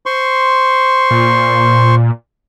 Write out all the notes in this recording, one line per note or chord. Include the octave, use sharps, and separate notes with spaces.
C5 C6 C#6
A#2